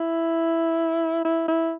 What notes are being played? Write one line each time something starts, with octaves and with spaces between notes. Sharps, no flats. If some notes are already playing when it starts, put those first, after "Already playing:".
Already playing: E4
E4
E4